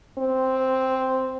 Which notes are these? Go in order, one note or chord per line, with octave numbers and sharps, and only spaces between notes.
C4